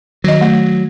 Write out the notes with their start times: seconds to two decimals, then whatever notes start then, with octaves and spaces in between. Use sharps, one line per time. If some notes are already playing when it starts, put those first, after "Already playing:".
0.24 D#3 F#3 D#5
0.41 A3